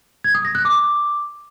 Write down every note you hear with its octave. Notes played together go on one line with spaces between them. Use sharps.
G#6
D#6
A#6
F#6
D6